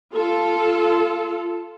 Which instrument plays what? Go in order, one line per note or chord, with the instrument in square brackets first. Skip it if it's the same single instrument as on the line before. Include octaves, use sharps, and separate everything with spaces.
[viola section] F4 A4